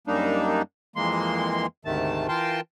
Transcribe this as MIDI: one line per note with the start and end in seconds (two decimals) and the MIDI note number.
0.07 0.62 42
0.07 0.62 55
0.07 0.62 58
0.07 0.62 62
0.07 0.62 63
0.96 1.66 41
0.96 1.66 52
0.96 1.66 56
0.96 1.66 58
0.96 1.66 84
1.85 2.28 38
1.85 2.28 44
1.85 2.28 48
1.85 2.28 51
1.85 2.28 57
1.85 2.28 81
2.28 2.61 52
2.28 2.61 65
2.28 2.61 70
2.28 2.61 79
2.28 2.61 81
2.28 2.61 84